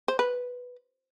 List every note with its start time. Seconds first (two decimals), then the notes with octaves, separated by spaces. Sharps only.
0.08 C5
0.19 B4